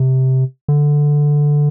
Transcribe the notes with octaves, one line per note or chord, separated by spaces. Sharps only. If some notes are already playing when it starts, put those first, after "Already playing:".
Already playing: C3
D3